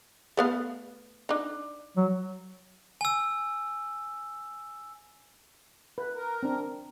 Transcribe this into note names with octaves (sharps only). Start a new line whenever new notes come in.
A3 B3 F5
D4 D#4
F#3
G#5 E6
B4
A#4
C4 D4